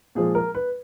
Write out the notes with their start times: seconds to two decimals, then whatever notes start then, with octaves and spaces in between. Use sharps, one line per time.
0.15 A#2 F3 G#3 G#4
0.35 A#4
0.55 B4